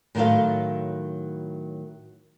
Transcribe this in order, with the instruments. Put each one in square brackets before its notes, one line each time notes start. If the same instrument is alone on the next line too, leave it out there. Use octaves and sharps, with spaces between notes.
[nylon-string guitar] A2 D#3 F#3 F4 A4 F5